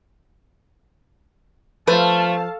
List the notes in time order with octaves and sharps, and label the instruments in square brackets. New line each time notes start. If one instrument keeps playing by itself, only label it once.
[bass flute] F3 [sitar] A3 [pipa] C4 B4 C5 [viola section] F5 A5